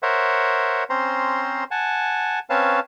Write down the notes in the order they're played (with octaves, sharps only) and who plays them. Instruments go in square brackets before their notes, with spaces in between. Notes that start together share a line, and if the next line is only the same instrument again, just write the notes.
[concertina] A#4 C5 C#5 E5 F#5
C4 C#4 C5 A#5 C6
F#5 G#5 A5
C4 C#4 B4 C#5 F5 A5